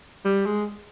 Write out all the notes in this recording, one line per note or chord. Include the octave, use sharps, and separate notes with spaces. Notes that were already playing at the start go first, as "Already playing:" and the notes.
G3
G#3